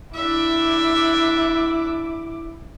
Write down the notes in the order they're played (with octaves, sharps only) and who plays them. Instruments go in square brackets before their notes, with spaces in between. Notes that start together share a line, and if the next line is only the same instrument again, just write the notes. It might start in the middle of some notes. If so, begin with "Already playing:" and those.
[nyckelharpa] D4 E5 [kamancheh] E4 D6